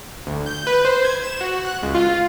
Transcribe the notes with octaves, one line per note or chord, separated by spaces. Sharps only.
D2
G6
B4
C5
G#6
E7
F#4
F#6
C#2
F4